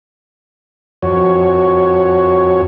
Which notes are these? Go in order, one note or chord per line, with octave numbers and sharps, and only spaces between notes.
F2 F#4 C#5